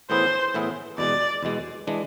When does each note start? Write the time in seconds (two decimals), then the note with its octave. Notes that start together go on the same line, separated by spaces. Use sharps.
0.10 A2 E3 B3 E4 G#4 C5
0.54 A2 E3 B3 E4 G#4
0.98 E2 B2 G#3 D5
1.43 E2 B2 G#3
1.87 E3 G#3 D4